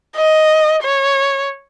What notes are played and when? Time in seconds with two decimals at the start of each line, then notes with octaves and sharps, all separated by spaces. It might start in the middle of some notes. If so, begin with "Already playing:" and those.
0.16 D#5
0.83 C#5